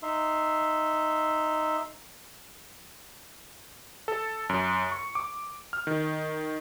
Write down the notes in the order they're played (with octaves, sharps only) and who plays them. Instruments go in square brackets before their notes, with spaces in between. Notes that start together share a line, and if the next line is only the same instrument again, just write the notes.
[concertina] D#4 E5 C6
[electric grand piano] A4
F#2
C#6
D6
F6
D#3